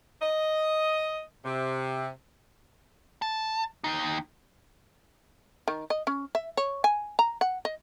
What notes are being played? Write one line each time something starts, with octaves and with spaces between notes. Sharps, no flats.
D#5
C3
A5
D#2 D#4
D#3
D#5
C#4
E5
C#5
G#5
A#5
F#5
D#5